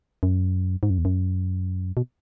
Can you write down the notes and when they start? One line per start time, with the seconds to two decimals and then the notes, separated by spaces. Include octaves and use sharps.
0.23 F#2
0.83 G#2
0.90 F#2
0.98 E2
1.05 F#2
1.97 B2